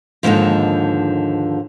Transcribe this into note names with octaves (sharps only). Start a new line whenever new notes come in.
D#2 G#2 D3 E3 F3